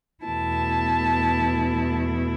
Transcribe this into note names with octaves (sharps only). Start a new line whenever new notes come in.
E2 B2 A3 E4 A5